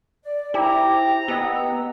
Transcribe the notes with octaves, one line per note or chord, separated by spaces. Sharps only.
D5
D#4 E4 G4 C5 A#5
B3 G4 D#5 F#5 E6